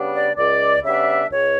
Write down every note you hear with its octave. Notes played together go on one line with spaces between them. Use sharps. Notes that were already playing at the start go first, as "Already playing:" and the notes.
Already playing: C#3 G3 B3 D4
D5
C#2 D5
C#3 G3 B3 D4 E5
C#2 C#5